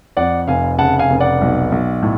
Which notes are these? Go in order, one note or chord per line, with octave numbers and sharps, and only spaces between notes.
F2 D5 F#5
F1 F5 G#5
C#3 F#5 A5
F5 G#5
F1
D5 F#5
B1
B1
A2